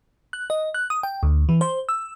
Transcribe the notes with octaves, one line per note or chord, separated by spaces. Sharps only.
F#6
D#5
F#6
D#6
G5
D2
E3
C5
E6